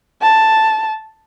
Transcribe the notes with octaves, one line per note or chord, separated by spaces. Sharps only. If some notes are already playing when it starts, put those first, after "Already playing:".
A5